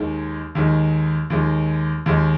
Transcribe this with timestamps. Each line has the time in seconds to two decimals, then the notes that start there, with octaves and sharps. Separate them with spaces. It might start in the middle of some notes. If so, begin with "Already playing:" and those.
Already playing: D#2 D#3 G#3
0.55 D#2 D#3 G#3
1.30 D#2 D#3 G#3
2.06 D#2 D#3 G#3